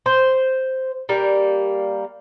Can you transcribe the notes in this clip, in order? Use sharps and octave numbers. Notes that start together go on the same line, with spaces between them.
C5
G3 A#3